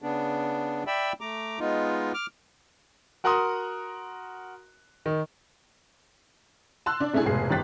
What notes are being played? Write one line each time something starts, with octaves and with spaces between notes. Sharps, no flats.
C#3 B3 D4
D5 E5 G5 B5 E6
A3 A#5 D6
G#3 B3 D#4 F4
D6 F6
F#4 A#4 F#5 A#5 C6 D#6
D#3
A5 C6 E6 F#6
D4 D5
C3 A3 D4 E4 G#4
F1 G#2 B2 G#4 C7
G1 D#3 G4 F#6 A6 B6